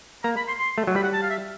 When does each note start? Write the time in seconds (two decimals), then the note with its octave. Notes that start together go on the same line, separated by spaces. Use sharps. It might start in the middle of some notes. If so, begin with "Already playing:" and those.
0.24 A#3 A#5
0.37 B5
0.48 C6
0.59 C6
0.78 A3
0.87 F#3
0.95 G3 B5
1.03 F#5
1.13 A5
1.22 F5
1.30 E5